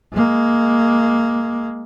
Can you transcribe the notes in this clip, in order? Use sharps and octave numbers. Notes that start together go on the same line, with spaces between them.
G#3 A#3